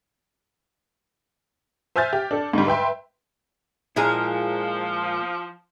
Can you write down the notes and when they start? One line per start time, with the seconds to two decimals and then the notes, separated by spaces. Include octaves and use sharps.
1.96 C5 E5 G#5 F6 G6 A6
2.13 G4
2.31 D4 A4
2.53 G#2 D3 G3
2.67 B4 E5 G5 C6
3.96 A#2 F3 G#3 E4 G#4 A#4